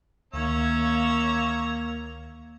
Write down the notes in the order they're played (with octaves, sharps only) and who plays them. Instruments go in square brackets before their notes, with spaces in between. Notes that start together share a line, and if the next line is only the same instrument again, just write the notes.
[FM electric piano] D2 D#3 [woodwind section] A#3 [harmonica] C#4 E5 A#5 [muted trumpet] C#5